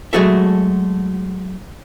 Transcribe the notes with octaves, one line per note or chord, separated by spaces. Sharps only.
F#3 G#3 A3 F#4 A4 E5